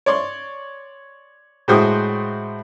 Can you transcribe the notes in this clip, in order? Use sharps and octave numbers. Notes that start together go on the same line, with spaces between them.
C#5 D5 C6
A2 G#3 F#4 C5 G5 D#6